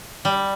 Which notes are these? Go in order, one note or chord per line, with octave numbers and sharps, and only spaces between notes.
G3